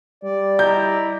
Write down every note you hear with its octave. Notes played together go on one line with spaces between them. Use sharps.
G3 D5
E4 D#5 A#5 G6